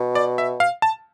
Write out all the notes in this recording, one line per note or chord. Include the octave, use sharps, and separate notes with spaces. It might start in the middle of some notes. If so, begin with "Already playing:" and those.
Already playing: B2
D5
E5
F5
A5